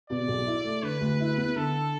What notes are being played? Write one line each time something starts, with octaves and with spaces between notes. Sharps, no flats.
B2 D5
B1
E4
A3
D3 B4
D2
E4
B3
D3 A4